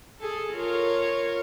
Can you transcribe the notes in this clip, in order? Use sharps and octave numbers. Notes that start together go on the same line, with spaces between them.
G#4 A4
F4 A#4 C#5